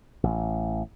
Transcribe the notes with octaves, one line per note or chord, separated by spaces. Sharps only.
A1